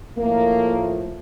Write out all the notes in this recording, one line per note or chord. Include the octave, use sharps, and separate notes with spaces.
A2 F3 A3 A#3